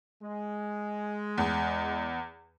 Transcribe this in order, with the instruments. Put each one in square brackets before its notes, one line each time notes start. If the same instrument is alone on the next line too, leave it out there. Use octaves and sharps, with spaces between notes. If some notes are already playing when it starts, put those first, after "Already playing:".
[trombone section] G#3
[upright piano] E2